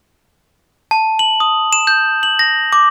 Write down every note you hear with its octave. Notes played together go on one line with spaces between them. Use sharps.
A5
F#7
D#6
E7
G6
F#7
A#6
D6